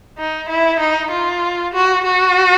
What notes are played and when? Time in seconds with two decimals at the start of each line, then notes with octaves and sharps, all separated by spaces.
0.18 D#4
0.49 E4
0.80 D#4
1.11 F4
1.73 F#4
2.04 F#4